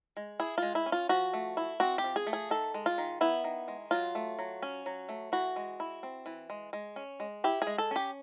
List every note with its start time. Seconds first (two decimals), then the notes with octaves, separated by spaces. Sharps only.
0.17 G#3
0.39 E4 G#4
0.58 G#3 F4
0.75 E4
0.86 C#4
0.92 F4
1.09 F3 F#4
1.33 A3
1.57 E4
1.80 C4 F#4
1.98 G4
2.04 F3
2.16 G#4
2.27 A3
2.33 G#4
2.50 D#3 A4
2.74 G#3
2.86 F4
2.98 D#3
3.21 B3 E4
3.44 D#3
3.68 G#3
3.91 F#3 F4
4.15 A3
4.39 F#3
4.62 C#4
4.86 F#3
5.09 A3
5.32 E3 F#4
5.56 G#3
5.80 E4
6.03 C4
6.26 E3
6.50 G#3
6.73 G#3
6.96 C#4
7.20 G#3
7.44 E4 G4
7.62 G#4
7.67 G#3
7.78 A4
7.91 C#4 G4